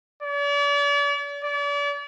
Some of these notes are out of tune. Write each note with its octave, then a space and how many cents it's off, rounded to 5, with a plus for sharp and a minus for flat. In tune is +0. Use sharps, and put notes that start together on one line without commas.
D5 -40
D5 -40